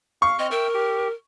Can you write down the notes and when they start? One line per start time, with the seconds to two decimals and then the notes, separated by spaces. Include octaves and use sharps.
0.22 F5 C#6
0.39 C4 D#5 F6
0.51 A#4 E5 G5 E6
0.74 G4